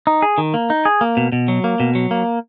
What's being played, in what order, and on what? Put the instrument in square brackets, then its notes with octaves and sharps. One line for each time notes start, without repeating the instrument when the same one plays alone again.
[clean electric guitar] D#4
G#4
D#3
A#3
D#4
G#4
A#3
B2
B2
F#3
A#3
B2
F#3
A#3